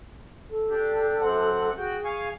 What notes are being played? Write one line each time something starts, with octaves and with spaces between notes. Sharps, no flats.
A4
D4 G4
F#2 C4 F#5
F#4 G#4 G5
F5 G#5 C#6